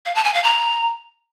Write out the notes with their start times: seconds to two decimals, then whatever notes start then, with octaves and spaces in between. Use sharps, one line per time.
0.06 F5
0.15 A5
0.25 G#5
0.34 F5
0.44 A#5